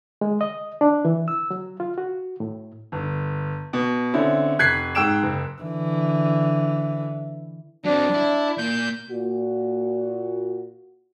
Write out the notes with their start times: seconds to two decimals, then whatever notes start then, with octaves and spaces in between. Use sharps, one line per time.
0.21 G#3
0.41 D#5
0.81 D4
1.05 E3
1.28 E6
1.51 F#3
1.80 F4
1.98 F#4
2.40 A2
2.92 G1
3.73 B2
4.14 D3 C4 C#4 E4
4.59 F1 F#6 G#6 B6 C7
4.95 G#2 G5 E6 D7 E7
5.23 F#1
5.62 D3 E3
7.85 F#3 C4 D4
8.14 E4
8.58 A#2 G6
9.10 A#2 F#4